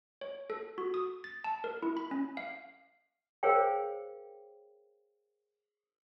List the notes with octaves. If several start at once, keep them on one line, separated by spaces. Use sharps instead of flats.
C#5
A4
F#4
D#6
A6
A5
A#4
E4
B5
C#4
F5
G#4 A#4 C5 C#5 F5 G5